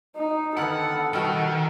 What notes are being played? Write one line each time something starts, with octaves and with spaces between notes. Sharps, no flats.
D#4
D3 D#3 B3 A4 F#5 B5 D#6 F6
B2 D#3 G3 F#4 F#5 E6 F6